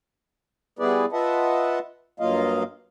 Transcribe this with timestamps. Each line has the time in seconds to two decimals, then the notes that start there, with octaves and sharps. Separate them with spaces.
0.79 G3 B3 E4 G#4 B4 D5
1.12 F4 B4 D#5 E5 F#5 A5
2.20 G2 F#3 A#3 F4 D#5 F5